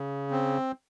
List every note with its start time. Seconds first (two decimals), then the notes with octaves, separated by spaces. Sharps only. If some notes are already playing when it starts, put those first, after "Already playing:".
Already playing: C#3
0.31 C4